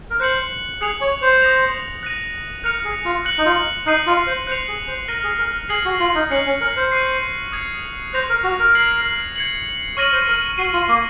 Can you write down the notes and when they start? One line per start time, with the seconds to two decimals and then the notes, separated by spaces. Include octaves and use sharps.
0.10 A#4
0.20 C5 F#6 C#7 F#7
0.81 G#4 F#6 C#7 F7
1.01 C#5
1.22 C5
1.42 D#6 A#6 F7
2.03 F#6 A#6 D#7
2.64 A#4 F#6 C#7 F7
2.84 G#4
3.05 F4
3.25 F#6 C#7 F#7
3.38 D#4
3.46 F4
3.86 D#4 F#6 C7 D#7
4.07 F4
4.27 C5
4.47 C5 F#6 C#7 F7
4.68 G#4
4.88 C5
5.08 A#4 F6 A#6 D#7
5.24 G#4
5.38 A#4
5.69 G#4 F6 G#6 C7 F#7
5.85 F#4
6.00 F4
6.15 D#4
6.30 C#4 F#6 C#7 F#7
6.46 C#4
6.61 A#4
6.76 C5
6.92 C#6 F#6 C7
7.52 D#6 G#6 C#7
8.13 C5 F#6 A#6 F7
8.29 A#4
8.44 F#4
8.59 A#4
8.75 G#6 C7 F#7
9.36 G#6 C#7 F#7
9.97 C#5 C#6 F6 A#6 D#7 F#7
10.12 C5
10.27 A#4
10.58 F#4 F6 C7 D#7
10.73 F4
10.88 A#3